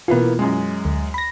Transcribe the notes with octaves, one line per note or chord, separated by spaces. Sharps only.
B2 E3 A#3 B3 E4 F4
F#2 G#3
D2
B5 A#6